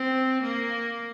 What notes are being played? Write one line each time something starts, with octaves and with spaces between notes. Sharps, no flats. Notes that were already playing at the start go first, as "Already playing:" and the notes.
Already playing: C4
A#3